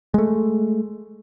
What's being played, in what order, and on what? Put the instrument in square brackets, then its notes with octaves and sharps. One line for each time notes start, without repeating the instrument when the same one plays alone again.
[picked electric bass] G#3 A3